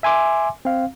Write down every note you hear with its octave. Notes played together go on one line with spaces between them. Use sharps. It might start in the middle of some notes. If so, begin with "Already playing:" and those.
E5 G#5 C6 D6
C4 F5